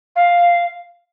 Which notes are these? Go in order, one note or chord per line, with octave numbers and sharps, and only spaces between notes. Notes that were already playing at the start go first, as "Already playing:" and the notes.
F5